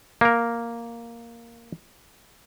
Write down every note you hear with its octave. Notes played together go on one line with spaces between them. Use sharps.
A#3 A#4